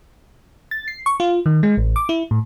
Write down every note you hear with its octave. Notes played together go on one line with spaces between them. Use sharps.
A6
C7
C#6
F4
D#3
G#3
A1
D6
E4
A2